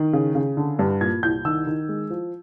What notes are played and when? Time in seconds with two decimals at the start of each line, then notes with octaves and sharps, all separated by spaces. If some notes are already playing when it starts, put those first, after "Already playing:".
Already playing: D#3
0.13 C#3
0.35 C#3
0.57 D3
0.79 G2
1.01 A#2 G#6
1.23 C2 G6
1.45 D#3 E6
1.67 D#3
1.89 G#3
2.10 F3